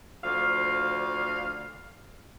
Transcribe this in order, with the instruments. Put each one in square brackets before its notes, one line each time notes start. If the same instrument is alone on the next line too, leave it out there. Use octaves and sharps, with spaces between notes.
[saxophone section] D2 F3 F5